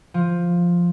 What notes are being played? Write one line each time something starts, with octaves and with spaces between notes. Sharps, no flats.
F3